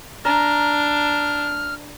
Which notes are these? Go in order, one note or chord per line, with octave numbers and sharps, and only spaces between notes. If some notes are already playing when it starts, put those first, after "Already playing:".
D4 A#5 F6